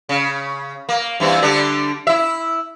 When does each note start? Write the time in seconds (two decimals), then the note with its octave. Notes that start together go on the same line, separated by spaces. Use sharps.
0.09 C#3
0.89 A#3
1.20 G2 E3 C4
1.42 D3 G3 D4
2.07 E4 E5